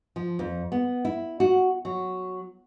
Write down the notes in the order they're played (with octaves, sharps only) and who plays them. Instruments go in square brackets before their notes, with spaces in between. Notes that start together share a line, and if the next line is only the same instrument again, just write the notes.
[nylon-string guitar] F3
F2
B3
E4
F#4
F#3